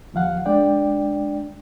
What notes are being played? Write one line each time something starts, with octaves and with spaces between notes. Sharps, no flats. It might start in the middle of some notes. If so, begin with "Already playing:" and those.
D#2 F3 F5 F#5
G#3 D4 D5 G5